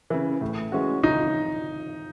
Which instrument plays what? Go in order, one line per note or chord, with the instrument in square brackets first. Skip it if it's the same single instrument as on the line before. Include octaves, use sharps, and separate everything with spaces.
[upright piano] C#3 E3
A2
E3 G#3 C#4 F#4
[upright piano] C#2 [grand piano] D#4